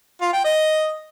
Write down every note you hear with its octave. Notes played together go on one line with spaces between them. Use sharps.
F4
G5
D#5